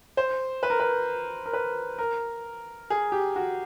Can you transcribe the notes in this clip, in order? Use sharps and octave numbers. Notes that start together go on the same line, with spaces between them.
C5
B4
A#4
B4
A#4
B4
A#4
G#4
G4
F#4